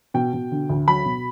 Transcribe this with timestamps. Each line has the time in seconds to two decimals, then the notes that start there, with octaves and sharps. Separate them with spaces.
0.14 B2 G5
0.33 B2
0.51 D3
0.69 D2
0.88 F#3 B5
1.05 B2